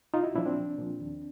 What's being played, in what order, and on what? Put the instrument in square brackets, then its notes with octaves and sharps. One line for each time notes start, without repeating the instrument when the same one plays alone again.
[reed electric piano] C2 D#4 F4
E4 F#4
A#2 F3 D4 E4
C4 D4
C2
A#2 F3
D#2